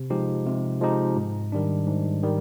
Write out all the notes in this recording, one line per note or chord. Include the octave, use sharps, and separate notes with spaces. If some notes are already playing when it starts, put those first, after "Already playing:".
Already playing: C3
F3 G#3 D#4 G4
C3
F3 G#3 D#4 G4
G#2
D#3 G3 D4
G#2
D#3 G3